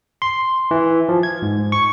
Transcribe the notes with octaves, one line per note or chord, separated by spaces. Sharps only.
C6
E3
F3
G#6
G#2
C#6